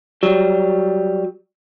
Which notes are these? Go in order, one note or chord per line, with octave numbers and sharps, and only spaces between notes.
F#3 G3